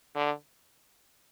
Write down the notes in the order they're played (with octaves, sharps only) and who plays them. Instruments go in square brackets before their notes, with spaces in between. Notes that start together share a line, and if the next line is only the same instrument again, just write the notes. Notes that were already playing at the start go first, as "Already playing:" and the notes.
[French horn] D3